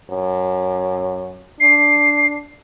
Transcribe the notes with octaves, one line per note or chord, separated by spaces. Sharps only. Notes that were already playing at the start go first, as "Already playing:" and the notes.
F#2
D4 C7